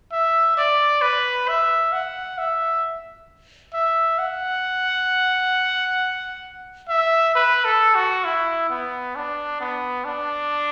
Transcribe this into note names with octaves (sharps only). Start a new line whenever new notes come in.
E5
D5
B4
E5
F#5
E5
E5
F#5
E5
B4
A4
F#4
E4
B3
D4
B3
D4